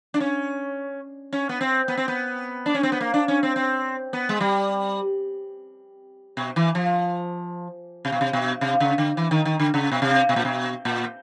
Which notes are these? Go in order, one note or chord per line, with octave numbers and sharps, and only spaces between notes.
D4
C#4
C#4
B3
C4
B3
C4
B3
D4
C#4
C4
B3
A#3
D4
C#4
C4
C4
B3
G#3
G3
B2
E3
F3
C3
B2
C3
B2
C3
C#3
D3
E3
D#3
D#3
D3
C#3
B2
C3
B2
A#2
B2
A#2